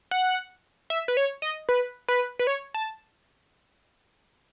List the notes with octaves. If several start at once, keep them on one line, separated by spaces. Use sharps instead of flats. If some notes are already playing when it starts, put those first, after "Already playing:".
F#5
E5
B4
C#5
D#5
B4
B4
B4
C#5
A5